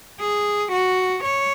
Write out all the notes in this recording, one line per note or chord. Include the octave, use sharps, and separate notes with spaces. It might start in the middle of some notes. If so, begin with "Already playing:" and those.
G#4
F#4
C#5